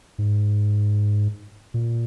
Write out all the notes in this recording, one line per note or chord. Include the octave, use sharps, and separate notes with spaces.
G#2
A#2